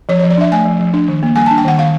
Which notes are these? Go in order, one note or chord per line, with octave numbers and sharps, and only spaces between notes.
F3 C#5
F3 C#5
D5
D4 E5
A3 G#5
F3
F3
D4
D#3
A#3
G3 G#5
D4 A5
G5
D#3 F#5
D#3 F5